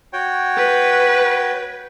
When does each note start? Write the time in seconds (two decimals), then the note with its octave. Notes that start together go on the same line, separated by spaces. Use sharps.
0.13 F#4 C#5 G5
0.57 B4